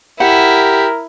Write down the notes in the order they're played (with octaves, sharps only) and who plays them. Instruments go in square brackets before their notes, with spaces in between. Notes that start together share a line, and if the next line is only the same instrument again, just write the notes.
[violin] E4 [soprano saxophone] G4 [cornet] A#4 [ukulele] F#5